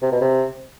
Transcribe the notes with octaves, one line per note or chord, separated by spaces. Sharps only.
C3
B2
C3